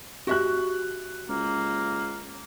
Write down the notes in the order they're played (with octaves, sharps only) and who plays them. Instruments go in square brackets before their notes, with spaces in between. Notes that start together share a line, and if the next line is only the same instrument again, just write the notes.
[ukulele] F#4 E5 [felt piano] G4 F#6
[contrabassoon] C#2 [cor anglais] A#3